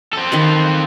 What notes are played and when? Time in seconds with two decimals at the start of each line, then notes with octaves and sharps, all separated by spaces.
0.13 C4 A4
0.32 D#3 D#5 B5